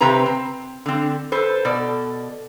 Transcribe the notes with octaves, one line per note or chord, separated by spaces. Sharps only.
C3 C4 G4 B4 A#5
C4
D3 C4
A4 B4 C5
B2 A4 D5